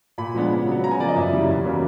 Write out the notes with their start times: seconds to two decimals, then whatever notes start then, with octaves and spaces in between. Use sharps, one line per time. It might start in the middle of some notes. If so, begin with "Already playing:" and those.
0.18 A#2 B5
0.35 F3 G#3 B3 D4
0.51 C#3
0.67 F#3 B3
0.83 C#3 A#5
0.91 G#5
1.00 F3 A#3 D5
1.09 D#5
1.16 F#2 E5
1.32 C#3 E3 G3
1.49 E2
1.66 C#3 F#3 A#3